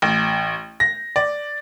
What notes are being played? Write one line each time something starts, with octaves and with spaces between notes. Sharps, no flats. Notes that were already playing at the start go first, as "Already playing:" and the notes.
A1
A#6
D5